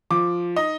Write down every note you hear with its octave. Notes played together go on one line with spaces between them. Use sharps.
F3 D6
D#4 D#5